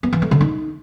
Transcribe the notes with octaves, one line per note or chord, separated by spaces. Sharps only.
B3
E3
A3
D3
D#4